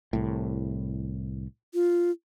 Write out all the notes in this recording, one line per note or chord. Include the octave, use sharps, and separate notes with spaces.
C2 A2
F4